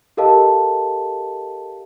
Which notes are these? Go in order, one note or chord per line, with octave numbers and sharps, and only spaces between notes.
G4 A4 A#4 D#5 F5 A5